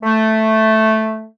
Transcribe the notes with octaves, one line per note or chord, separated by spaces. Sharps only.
A3